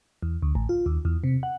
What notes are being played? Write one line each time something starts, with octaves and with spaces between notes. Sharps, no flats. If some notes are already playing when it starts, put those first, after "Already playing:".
E2
D2
A1
F4
D#2
E2
C3
F#5